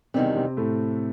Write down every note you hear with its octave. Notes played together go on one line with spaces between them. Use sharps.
E2 C3 D#3 G3 C4
C3 C4
A2 A3